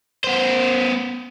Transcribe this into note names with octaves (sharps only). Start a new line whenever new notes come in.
B3 C5